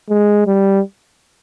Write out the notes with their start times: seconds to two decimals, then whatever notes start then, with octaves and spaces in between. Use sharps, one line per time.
0.10 G#3
0.47 G3